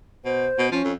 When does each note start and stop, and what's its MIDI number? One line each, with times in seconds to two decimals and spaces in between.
0.25 0.47 47
0.25 0.71 72
0.58 0.68 47
0.72 0.81 53
0.72 0.92 61
0.84 0.93 41